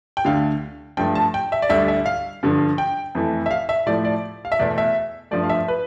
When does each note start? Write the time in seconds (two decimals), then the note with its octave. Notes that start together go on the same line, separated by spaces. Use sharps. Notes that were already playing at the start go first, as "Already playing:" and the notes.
0.17 G5
0.25 D2 D3 A3 F5
0.97 G2 F3 A3 G5
1.15 A5
1.34 G5
1.52 E5
1.62 D5
1.69 D2 D3 G3 E5
1.88 E5
2.06 F5
2.43 G2 D3 F3
2.78 G5
3.15 F2 E3 A3
3.46 E5
3.51 F5
3.69 E5
3.86 A2 F3 A3 D5
4.05 D5
4.45 F5
4.52 E5
4.59 E2 B2 A3 D5
4.78 E5
5.31 G2 F3 A3 D5
5.43 F5
5.49 E5
5.68 B4